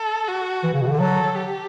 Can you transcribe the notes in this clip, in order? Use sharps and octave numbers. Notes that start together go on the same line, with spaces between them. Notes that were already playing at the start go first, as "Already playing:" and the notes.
Already playing: A4
F#4
E3
C#3
B2
C#3
D3
F#3 A4
G4